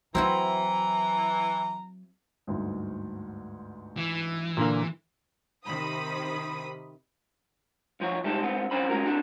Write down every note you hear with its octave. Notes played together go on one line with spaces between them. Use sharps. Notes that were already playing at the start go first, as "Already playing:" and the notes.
E3 F#3 C4 E4 F#4 A#5
G1 D2 G#2
E3
A#2 D3 A#3
C3 D#3 B5 D#6
B1 F3 C#5
C3 G3 G#3 D#4 A4
G#3 B3 C4
F#2 D#3 C4 C#4 C5 B5
G#3 C#4 F#4 A#4
C4 D4 F#4 A4